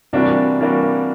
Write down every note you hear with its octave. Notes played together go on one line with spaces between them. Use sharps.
C3 E3 G3 A#3 D4 F#4
E3 G3 A#3 D4 F#4